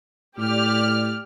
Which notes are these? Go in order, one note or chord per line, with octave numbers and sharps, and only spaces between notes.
A2 G4 D5 F6